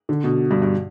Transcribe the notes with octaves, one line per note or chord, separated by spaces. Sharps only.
D3
B2
G2
G2